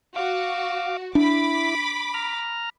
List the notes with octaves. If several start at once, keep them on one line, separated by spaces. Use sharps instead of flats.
F#4 F5 D6
D4 E4 B5 D6
A#5 F6